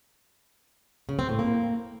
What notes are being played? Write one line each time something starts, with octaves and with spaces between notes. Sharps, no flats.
C#3
C4
A2
A#3